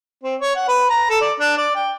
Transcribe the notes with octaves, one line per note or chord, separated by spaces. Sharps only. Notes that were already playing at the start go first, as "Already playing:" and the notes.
C4
C#5
F#5
B4
A#5
A4
D5
D4
D5
G5